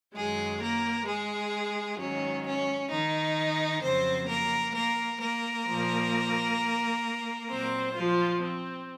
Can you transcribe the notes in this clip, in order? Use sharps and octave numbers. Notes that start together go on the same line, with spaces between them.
F#2 D#3 F#3 G#3 G#4
A#3 A#4
G#3 G#4
G#2 D#3 F#3 C#4
C#4
D#3 D#4
F2 C#3 F#3 C4 C5
A#3 A#4
A#3 A#4
A#3 A#4
A#2 F3
A#2 F#3 C4 C5
F3 F4
C4